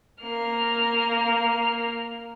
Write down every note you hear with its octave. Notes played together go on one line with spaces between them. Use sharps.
A#3 F6